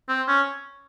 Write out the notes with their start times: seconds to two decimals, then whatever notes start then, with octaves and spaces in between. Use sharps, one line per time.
0.09 C4
0.28 C#4